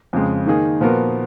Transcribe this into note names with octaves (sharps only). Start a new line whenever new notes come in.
F2 C#3 G#3
D#3 A#3 D#4 G#4
A#2 F3 B3 F#4 A#4